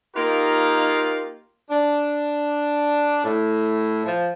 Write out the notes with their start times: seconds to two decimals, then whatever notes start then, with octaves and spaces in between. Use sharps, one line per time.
0.15 A#3 D#4 F4 G4 A#4
1.70 D4
3.24 A2
4.05 F3